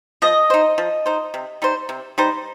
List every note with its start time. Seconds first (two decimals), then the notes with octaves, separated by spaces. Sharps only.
0.22 F3 D#5
0.50 D#4 C5
0.78 F3
1.06 D#4 C5
1.34 C3
1.62 G3 D#4 C5
1.89 C3
2.18 G3 D#4 C5